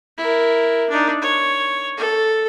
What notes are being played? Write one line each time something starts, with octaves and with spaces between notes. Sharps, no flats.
E4 A#4
D4 D#4
C#5
A4